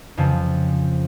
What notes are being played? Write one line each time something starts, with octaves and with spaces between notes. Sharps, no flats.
F2 C#3 F3